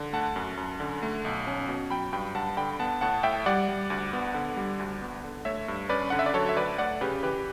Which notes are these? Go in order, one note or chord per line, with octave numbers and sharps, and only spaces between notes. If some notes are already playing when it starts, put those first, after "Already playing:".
Already playing: D3
A3 F#5 A5
F#2
F#2
D3
A3
B1
C#4
B2
F#3 G5 B5
G2 G5 B5
G2 F#5 A5
D3 G5 B5
B3 F#5 A5
A2 F#5 A5
A2 E5 G5
G3 D5 F#5
G3
D2
B3
D3
G3
D2
B3
D3
A3 C#5 E5
G2
C#4 B4 D5
D3 F#5
E5
D5
F#3 A4 C#5
E5
D2 B4 D5
A3 D5 F#5
C#3 G4 B4
E3 G4 B4